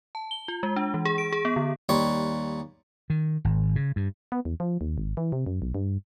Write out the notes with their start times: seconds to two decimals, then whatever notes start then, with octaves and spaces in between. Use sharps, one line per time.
0.15 A5
0.31 G7
0.48 F4
0.63 G#3
0.76 D4
0.94 E3
1.05 G#4
1.18 D7
1.32 G#4
1.45 B3
1.56 D3
1.89 D#2 G3 C#5 C6
3.10 D#3
3.45 G#1
3.76 C#3
3.96 G2
4.32 B3
4.45 E2
4.60 F3
4.81 D#2
4.98 G#1
5.17 E3
5.32 C3
5.46 F#2
5.62 B1
5.75 G2